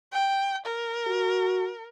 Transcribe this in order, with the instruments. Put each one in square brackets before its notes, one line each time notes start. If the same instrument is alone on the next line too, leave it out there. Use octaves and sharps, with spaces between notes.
[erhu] G5
A#4
[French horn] F#4